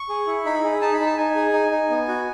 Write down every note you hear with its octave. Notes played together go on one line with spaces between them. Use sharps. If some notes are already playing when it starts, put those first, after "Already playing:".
Already playing: C#6
G#4
E4
D#4 B5
G#4
D#4 A5
B5
D#4
A5
D#4 G#5
G#4
D#4
D#4
B3
F#4